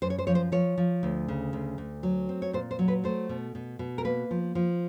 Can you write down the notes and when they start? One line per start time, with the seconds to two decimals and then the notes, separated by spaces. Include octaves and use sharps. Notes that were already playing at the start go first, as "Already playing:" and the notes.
0.02 F#2 C5
0.10 C#5
0.19 C5
0.27 F3 C#5
0.35 C5
0.52 F3 C#5
0.78 F3
1.03 D2
1.28 C#3
1.53 D2
1.78 D2
2.03 F#3
2.29 C4
2.42 C#5
2.53 A#2 C5
2.71 C5
2.79 F#3
2.88 B4
3.04 A3 C5
3.29 B2
3.55 B2
3.79 B2
3.98 A#4
4.05 A#3 B4
4.31 F3
4.55 F3